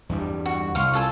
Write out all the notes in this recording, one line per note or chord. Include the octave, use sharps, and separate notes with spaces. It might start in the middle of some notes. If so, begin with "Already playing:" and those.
E2 G2 G3
F#4
C2 F5 C6 C#6
F4 A4 G#5